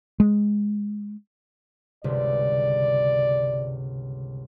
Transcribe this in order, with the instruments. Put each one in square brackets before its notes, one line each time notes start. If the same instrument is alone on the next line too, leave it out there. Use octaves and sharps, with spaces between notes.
[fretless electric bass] G#3
[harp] G1 C#2 C3 [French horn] D5